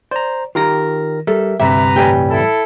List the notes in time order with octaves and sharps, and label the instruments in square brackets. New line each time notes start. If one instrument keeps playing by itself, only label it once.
[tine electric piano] C5 A#5 [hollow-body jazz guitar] D5
[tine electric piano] D#3 A#4 A#6 [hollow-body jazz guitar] F4 G4 A#5
[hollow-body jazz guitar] G3 [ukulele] A4 [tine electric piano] A#4 E5
[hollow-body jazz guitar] D2 G2 C3 [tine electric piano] G4 [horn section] B4 A#5 [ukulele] E5
[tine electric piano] A2 E3 G3 [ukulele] G4 G#5
[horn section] E4 A4